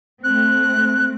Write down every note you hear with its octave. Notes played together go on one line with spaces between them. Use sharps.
A3 C4 F#6